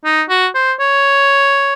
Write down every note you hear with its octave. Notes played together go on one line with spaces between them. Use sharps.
D#4
F#4
C5
C#5